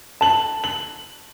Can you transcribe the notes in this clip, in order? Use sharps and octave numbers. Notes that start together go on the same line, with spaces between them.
A5 F#7
F#7